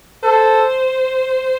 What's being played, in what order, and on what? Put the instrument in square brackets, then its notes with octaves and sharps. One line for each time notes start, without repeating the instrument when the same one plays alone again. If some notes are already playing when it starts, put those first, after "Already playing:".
[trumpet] A4 [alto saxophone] C5